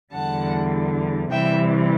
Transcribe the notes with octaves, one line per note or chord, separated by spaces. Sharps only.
E2 D3 G3 F#5 A5
C3 E3 G3 E5 G5